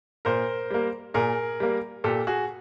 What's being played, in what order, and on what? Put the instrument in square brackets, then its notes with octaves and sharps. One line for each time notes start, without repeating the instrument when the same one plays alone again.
[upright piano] A#2 A#4 C5
G3 A#3
A#2 G#4 A#4
G3 A#3
A#2 G4 A4
F#4 G#4